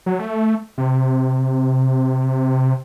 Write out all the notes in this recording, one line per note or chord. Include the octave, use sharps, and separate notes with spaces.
F#3
A3
C3